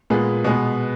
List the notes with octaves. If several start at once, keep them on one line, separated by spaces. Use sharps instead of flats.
A#2 G#3 B3
B2 G#3 B3